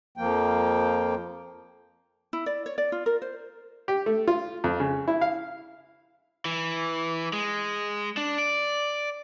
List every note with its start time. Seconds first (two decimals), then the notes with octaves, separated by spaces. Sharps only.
0.17 F2 F3 A#3 G5
2.33 E4
2.46 D5
2.66 C#5
2.78 D5
2.92 F4
3.06 A#4
3.22 C5
3.88 G4
4.06 A3
4.28 F4
4.64 F2
4.80 C#3
5.08 E4
5.21 F5
6.45 E3
7.33 G#3
8.17 D4
8.39 D5